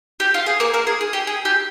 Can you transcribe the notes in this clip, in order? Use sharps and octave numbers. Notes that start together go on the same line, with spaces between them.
G4
F4
G#4
A#3 A#4
A#3 A#4
G#4
G#4
G4
G#4
G4